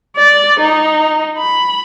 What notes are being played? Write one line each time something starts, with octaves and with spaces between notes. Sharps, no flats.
D5
D#4
B5